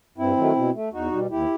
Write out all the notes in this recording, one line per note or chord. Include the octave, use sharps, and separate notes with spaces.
G2 C4 E4
D#3 F#3 A3
B2
A3
E2 D#4 F#4
B2 G3
D#2 E4 G4